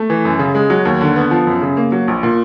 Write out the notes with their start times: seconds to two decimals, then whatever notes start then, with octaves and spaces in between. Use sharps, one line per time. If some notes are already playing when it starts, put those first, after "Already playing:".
Already playing: A3
0.10 E3
0.25 F#2
0.39 C#3
0.55 G#3
0.70 F#3
0.85 D#2
1.01 D3
1.16 B3
1.31 F3
1.47 F#2
1.62 C#3
1.77 A#3
1.92 F#3
2.08 A#1
2.23 A#2